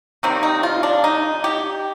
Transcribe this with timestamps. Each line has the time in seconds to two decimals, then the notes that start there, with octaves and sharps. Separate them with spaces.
0.23 C3 D#3 G3 A#3 C4
0.43 D#4
0.63 F4
0.83 D4
1.04 D#4
1.44 G4